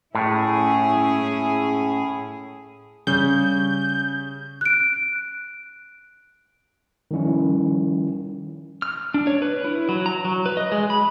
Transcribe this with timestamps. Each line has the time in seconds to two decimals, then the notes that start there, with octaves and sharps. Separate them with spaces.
0.15 A2 C#4 E4 G#4
3.07 C#3 G3 G6
4.61 F#6 D7
7.11 D#3 F3 G3 C#4 E4
8.82 F6
9.14 D4
9.27 C#5
9.42 B4
9.64 E4
9.89 F#3
10.06 A#5
10.25 F#3
10.46 B4
10.57 D#5
10.72 G#3
10.90 B5